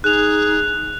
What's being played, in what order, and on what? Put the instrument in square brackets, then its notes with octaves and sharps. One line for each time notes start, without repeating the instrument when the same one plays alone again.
[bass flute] D#4 [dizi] G#4 [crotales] F#6 F7